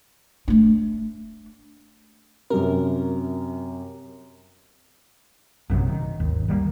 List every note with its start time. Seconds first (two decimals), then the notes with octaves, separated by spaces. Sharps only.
0.48 A3 D4
2.50 F#2 C3 A#4
5.70 A#1 F#2 C3 F#3
5.89 D#3
6.20 G#1 D#2
6.48 D#3 G3 A3 A#3